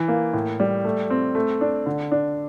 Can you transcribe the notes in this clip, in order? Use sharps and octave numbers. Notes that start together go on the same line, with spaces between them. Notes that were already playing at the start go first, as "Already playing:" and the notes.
Already playing: E3
A#3
A2
G3
A3
C4
A3
D4
D3
D4